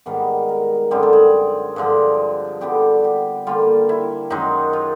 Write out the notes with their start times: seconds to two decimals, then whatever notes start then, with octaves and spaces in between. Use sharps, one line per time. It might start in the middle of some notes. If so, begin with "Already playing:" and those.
0.06 G#2 D#3 G3 B3 A#4
0.49 A#4
0.91 F#2 D3 G3 C4 G#4
1.03 A4
1.13 G#4
1.76 G2 D3 F3
2.61 D3 G3 B3 D4 G4
3.00 F#4 G4
3.47 D3 G3 A#3 F4
3.89 E4
4.30 F#2 D#3 G#3 D#4
4.73 F4